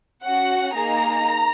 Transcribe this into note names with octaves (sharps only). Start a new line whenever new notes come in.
C#4 F#4 F#5
A#3 D#4 G#4 A#5